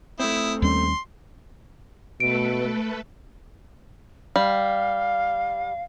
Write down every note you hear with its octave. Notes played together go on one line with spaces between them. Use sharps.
A3 C4 E4 D#6
D#2 G3 C#4 C6
B2 A3 A4 B4 D7
G3 F5